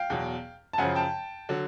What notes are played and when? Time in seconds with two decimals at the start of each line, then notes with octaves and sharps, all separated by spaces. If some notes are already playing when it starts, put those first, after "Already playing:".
Already playing: F5 G5
0.10 E2 B2 F#3
0.73 A5
0.78 F#2 C#3 F3 F#5 G#5
0.95 G5 A5
1.49 D3 F#3